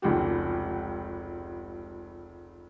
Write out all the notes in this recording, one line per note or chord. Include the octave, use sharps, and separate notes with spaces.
F1 C#2 G#2 F#4 G4